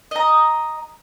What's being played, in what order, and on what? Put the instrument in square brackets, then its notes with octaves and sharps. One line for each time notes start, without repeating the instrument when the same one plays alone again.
[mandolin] D#5 A#5